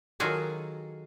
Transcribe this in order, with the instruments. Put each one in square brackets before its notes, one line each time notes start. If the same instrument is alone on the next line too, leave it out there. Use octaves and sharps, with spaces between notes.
[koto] D#3 F#3 F4 F#4 G#4 A4